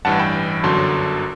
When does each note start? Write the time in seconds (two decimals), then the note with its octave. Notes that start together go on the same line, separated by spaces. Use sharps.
0.05 A1 G2 E3 F#5 A5
0.19 G5 B5
0.63 G1 F#2 D3 F#3 A5 C6